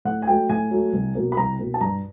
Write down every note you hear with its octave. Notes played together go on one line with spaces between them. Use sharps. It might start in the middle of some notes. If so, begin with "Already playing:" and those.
A2 F#5
G#5
F#3 A3 G5
A2 G#5
F#3 A3
C2
B2 F#3 A#3
B5
C2 A#5
B2 F#3 A#3
A5
G2 A#5